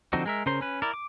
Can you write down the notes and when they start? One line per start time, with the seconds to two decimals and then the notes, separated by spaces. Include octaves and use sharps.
0.13 D3 F3 C4 D#4 F#4
0.26 G#3 A#4 E5
0.46 C#3 C#4 A#4 C5 C6
0.61 C#4 B4
0.82 E4 A#4 D5
0.94 D6